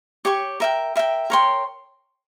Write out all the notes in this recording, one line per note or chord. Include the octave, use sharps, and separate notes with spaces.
G4 C#5 G5 C#6
A#4 E5 G5
A#4 E5 G5
A#4 C#5 G5 C6